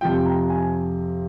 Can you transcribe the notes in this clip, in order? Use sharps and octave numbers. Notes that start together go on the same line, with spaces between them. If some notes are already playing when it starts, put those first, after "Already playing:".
F2 C3 F3 G5
A#5
G#5